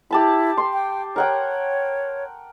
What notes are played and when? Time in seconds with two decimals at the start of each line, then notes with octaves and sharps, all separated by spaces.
0.11 E4 G4 A5 B5
0.57 C6
0.73 G5
1.16 A#4 C#5 F#5 G5